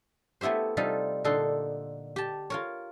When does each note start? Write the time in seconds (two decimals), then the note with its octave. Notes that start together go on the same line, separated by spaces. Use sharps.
0.41 A3 B3 E4 G4 C5
0.77 C3 G3 D#4 F4 A4
1.24 A#2 D3 D#4 A4 C6
2.16 G4 A5
2.50 F4 A#4 C#5